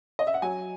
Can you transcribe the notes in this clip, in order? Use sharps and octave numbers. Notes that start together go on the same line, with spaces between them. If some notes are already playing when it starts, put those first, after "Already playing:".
D#5
E5
F#5
F#3 G#5